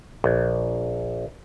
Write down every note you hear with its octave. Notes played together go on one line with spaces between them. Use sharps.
A#1